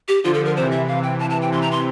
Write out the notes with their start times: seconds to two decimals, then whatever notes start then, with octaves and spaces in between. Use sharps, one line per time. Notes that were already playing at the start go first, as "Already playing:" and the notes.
0.08 G4
0.24 D3 F3 F4
0.34 A4
0.45 A#4
0.56 C3 E3 C5
0.71 E5
0.88 F5
1.03 G5
1.19 A5
1.30 A5
1.42 G5
1.52 C3 E3 C6
1.62 A#5
1.71 C6